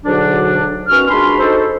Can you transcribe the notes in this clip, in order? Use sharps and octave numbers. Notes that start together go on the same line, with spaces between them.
D2 G#2 B2 D3 F#3 D4
D#3 B3 C#4 F#4 F6
A#2 G#3 D4 F#4 B5 C6
D#4 F#4 A4 C5